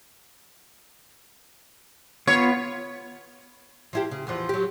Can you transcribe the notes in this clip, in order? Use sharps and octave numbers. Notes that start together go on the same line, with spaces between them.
B3 F4 C#5
F3 E4 G4
C#3
E2 E3 F3
F#3 G4